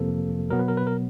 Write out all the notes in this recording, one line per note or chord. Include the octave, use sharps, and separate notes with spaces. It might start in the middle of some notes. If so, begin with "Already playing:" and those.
Already playing: F2 C3 F3 A#3 A4
B2 F#3 B3 A#4
B4
A#4
B4
A#4